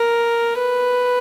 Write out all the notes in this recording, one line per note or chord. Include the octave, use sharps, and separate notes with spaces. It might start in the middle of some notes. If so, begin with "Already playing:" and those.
Already playing: A#4
B4